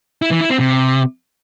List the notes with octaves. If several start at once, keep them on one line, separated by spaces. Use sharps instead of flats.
E4
E3
E4
C4
C3